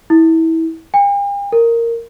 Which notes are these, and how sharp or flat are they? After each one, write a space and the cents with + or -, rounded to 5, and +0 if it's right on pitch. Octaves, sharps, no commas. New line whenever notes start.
E4 -25
G5 +45
A#4 -10